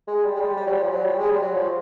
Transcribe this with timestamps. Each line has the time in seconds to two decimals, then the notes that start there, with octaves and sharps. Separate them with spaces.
0.08 G#3
0.24 G3
0.35 G#3
0.40 G3
0.57 G3
0.67 F#3
0.73 G3
0.83 F3
0.89 F#3
1.05 G3
1.18 G#3
1.29 G3
1.42 F#3
1.54 F3